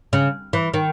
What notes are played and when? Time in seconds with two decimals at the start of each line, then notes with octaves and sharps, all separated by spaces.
0.13 C#3
0.53 E3
0.74 D#3